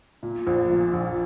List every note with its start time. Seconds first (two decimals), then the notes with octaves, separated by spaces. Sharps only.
0.23 A#2
0.47 A#1
0.70 A#2
0.93 A#1